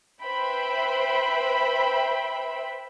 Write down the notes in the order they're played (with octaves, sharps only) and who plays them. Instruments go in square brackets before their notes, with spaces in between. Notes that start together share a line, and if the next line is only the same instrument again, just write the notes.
[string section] B4 C5 E5 G5 B5